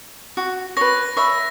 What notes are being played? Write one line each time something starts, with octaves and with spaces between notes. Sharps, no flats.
F#4
B4 C#5 A#6
C#5 E5 B5